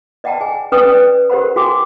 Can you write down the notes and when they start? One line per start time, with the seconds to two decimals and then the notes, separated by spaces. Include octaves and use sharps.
0.24 D5 D#5 F#5 G5 A5 A#5
0.40 G#4 G#5
0.72 C#4 B4 D5 G5 D#6
0.92 B4 D5
1.30 G4 A#4 C5 F#5 B5
1.56 F#4 G#4 G5 G#5 D6